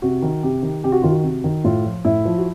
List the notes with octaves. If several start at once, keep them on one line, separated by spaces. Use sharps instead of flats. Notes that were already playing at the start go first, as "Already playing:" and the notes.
C3 F#4
D#3
C3 G4
D#3
C3 G4
F#4
D#3 F4
F#4
C3
D#3
A2 F4
F3
A2 E4
F3
F#4